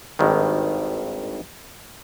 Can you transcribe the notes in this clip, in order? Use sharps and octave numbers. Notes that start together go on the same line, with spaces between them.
G#1 G2 D#3